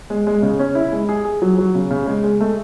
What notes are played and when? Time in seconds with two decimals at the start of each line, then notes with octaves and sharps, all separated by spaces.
0.10 G#3
0.27 G#3
0.42 C#3
0.59 C#4
0.75 E4
0.92 G#3
1.09 G#4
1.25 G#4
1.42 F#3
1.58 F#3
1.75 C#3
1.91 C#3
2.07 G#3
2.24 G#3
2.40 A3